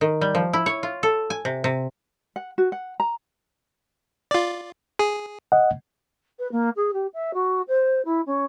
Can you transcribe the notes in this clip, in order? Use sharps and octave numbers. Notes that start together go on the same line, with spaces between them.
D#3
G3
F3
E4
C#5
F4
A4
G#5
C3
C3
F#5
F#4
F#5
A#5
F4 D5
G#4
D#5 F#5
B4
A#3
G#4
G4
E5
F#4
C5
E4
C#4